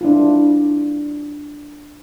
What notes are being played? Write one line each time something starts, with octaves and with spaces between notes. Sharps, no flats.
D4 E4 F4